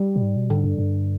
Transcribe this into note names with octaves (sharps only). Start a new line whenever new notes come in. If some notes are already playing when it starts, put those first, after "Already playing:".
Already playing: G3
B2
G#2
B2
G#2 D3
G2
G2